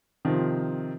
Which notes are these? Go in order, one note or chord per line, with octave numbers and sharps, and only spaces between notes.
C3 D#3 F3